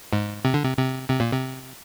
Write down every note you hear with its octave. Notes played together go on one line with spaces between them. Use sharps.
G#2
C3
D3
C3
C3
C3
A#2
C3